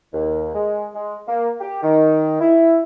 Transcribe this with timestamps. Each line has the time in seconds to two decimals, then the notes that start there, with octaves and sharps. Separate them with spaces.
0.13 D#2
0.54 G#3
0.94 G#3
1.27 A#3
1.60 G4
1.82 D#3
2.40 E4